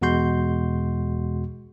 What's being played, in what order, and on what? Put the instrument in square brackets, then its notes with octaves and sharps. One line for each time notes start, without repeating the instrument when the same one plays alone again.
[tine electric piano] E2 B2 G#3 F#4 C6 G6